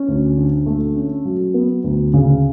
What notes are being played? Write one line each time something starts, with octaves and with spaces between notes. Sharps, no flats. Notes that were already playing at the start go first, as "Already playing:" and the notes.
Already playing: C#4
D2
D3
A3
C#4
F#3
B3
D2
C#3